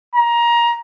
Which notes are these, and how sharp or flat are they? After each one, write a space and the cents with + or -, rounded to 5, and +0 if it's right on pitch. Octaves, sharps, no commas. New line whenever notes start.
A#5 +20